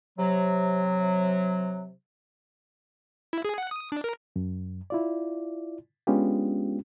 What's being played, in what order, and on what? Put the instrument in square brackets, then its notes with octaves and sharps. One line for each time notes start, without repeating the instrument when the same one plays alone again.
[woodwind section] C3 F#3
[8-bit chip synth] E4
G#4
F#5
D#6
D4
A#4
[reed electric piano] F#2
E4 F4 D5
G#3 B3 C#4 D4 F4 G4